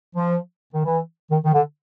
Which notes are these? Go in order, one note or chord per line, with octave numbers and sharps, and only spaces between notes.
F3
D#3
E3
D#3
D#3
D3